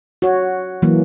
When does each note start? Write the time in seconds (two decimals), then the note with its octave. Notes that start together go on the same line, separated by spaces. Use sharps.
0.22 F#4 C#5
0.82 E3 F#3 A#3